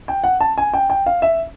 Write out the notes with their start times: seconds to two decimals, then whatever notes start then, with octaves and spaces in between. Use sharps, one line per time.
0.08 G5
0.24 F#5
0.41 A5
0.58 G#5
0.74 G5
0.90 G5
1.06 F5
1.22 E5